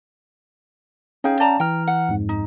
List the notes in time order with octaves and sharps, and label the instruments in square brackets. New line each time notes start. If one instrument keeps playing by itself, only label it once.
[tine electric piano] C#4 F5 G5 [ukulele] D#4 G#4
[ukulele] D5 A5 A#5
[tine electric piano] E3 A#5 F6 [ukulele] G5
[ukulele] F#5
[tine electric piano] F2 G#2
[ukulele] D#4